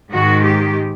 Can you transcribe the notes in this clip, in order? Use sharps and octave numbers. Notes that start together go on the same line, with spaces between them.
G#2 D#3 G#3 F#4
G4